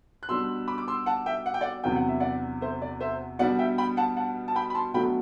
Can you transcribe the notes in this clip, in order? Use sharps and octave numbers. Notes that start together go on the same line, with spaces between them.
F#6
B2 G3 D4 C6 E6
B5 D6
D6
C6 E6
F#5 A5
E5 G5
F#5
G5
D5 F#5
E2 C3 F#3 B3 D4 G5
F#5
E5
D5 F#5
C5 E5
D5
C5 E5
B2 G3 D4 D5 F#5
E5 G5
G5 B5
F#5 A5
F#5 A5
A5
G5 B5
B5
A5 C6
B2 F#3 A3 D4 G5 B5